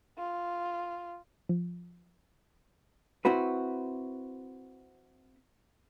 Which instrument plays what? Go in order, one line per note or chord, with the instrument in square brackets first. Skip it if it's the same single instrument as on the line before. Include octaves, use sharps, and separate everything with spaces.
[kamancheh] F4
[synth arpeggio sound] F3
[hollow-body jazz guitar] C4 E4 F#4 B4